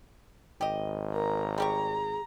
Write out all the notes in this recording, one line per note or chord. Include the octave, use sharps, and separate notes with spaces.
G#1 G4 D#5
A#4 A#5
G3 G4 G#4 A#5 C#6